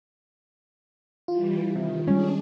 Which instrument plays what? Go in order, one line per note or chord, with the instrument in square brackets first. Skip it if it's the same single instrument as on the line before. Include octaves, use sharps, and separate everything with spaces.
[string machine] E3 G3 [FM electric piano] F4
[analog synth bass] C3 [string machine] D#3
[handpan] G3 G#3 [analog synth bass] C#4 [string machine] D4 G#4